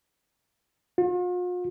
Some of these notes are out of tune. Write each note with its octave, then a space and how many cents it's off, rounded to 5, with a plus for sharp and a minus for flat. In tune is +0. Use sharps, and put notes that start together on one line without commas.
F4 +45